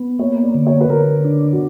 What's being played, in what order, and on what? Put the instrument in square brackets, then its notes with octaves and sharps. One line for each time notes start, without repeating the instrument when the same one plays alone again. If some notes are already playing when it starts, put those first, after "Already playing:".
Already playing: [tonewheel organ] B3
[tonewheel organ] A#3 [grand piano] C#5
[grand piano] D5
[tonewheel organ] D3
[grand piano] C#5
B4
[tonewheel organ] D3 [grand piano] A#4
[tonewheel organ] D4
[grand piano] F#4